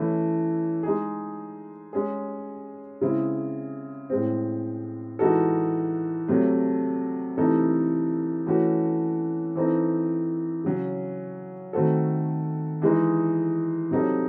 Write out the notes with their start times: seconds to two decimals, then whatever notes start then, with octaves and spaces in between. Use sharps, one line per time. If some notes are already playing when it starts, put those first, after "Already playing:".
Already playing: E3 A3 C#4 E4
0.83 G#3 D#4 G#4
1.93 G#3 C#4 G#4
3.01 C#3 G#3 C4 E4
4.10 A2 G#3 C4
5.19 E3 G#3 D#4 F#4 A4
6.28 C3 F#3 A3
7.37 C3 E3 A3 D#4 A4
8.47 E3 A3 C#4 F#4
9.55 E3 C4 D#4 A4
10.64 C#3 F#3 C#4
11.73 D#3 A3 C4 F#4 A4
12.82 E3 G#3 D#4 G#4
13.91 C3 F#3 C4 D#4 A4